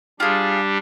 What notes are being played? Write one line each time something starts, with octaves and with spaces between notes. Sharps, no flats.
G3 D4 F4 G4 G#4